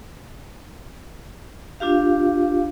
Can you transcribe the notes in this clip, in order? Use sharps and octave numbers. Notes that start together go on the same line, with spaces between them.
D4 F4 G4 F5